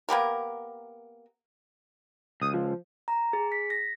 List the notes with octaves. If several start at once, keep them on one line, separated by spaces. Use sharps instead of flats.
A#3 B3 G4 A#4
C#2 D#6
F3
A#5
G#4
B6
A#6